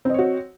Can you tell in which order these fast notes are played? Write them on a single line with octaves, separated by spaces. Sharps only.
C4 D#5 C#5 F#4